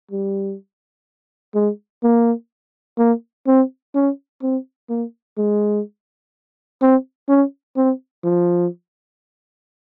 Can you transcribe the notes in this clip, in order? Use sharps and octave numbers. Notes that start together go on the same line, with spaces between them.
G3
G#3
A#3
A#3
C4
C#4
C4
A#3
G#3
C4
C#4
C4
F3